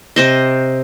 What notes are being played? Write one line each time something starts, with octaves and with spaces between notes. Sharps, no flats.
C3 C5 D#5